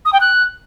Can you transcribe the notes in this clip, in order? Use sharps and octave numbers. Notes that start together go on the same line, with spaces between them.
D#6
G5
F#6